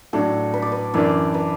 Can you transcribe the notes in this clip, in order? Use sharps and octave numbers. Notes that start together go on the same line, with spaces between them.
A2 F#3 D4 A4
B4
D5
B4
F#2 E3 D4 D5
B4